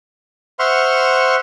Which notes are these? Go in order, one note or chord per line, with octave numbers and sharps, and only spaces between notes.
C5 E5 F#5 C6 C#6 F6